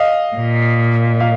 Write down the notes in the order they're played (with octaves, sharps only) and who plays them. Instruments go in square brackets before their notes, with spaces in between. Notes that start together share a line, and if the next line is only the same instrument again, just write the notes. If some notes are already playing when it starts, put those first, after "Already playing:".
Already playing: [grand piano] D#5 F5
[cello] A#2
[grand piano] F5